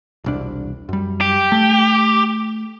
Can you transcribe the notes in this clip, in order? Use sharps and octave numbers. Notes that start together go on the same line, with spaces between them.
E1 C2 D4
F#2 G3
G4
A3